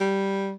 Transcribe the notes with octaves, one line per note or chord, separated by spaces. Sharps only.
G3